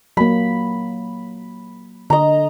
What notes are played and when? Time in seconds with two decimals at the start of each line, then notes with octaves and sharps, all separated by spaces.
0.17 F#3 A#3 B5
2.10 D3 D#5 A#5